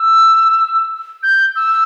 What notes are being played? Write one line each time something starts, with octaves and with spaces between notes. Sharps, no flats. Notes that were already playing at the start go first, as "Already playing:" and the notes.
Already playing: E6
G6
E6